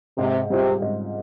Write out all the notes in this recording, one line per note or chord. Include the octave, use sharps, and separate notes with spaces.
G#2 C3
C3 G3 C4 F4
G#2